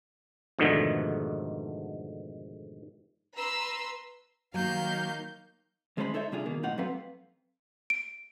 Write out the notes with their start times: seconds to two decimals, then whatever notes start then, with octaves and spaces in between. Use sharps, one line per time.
0.59 F2 G#2 B2 D3 D#3 A3
3.36 B4 A#5 C6 E6
4.54 D#3 F#3 A#3 F5 G6
5.97 D2 G#3 C#4 A4 C5 B5
6.14 D#4 A4 C5 C#5 E5
6.32 C3 G3 D4 F4 G#4
6.46 B2 D#3 A#3
6.63 B1 A2 D#4 F4 F#5
6.78 F#3 B3 C4 A4 B4 F5
7.90 D7